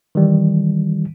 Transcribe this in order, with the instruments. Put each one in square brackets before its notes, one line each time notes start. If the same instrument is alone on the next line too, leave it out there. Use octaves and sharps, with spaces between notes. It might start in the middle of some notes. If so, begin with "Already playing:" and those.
[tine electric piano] D#3 E3 G3